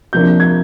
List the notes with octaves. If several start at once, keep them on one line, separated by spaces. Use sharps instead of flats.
C3 F3 A#3 D4 G6
G#6